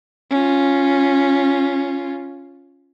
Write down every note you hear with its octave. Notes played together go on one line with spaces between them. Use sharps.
C#4 F4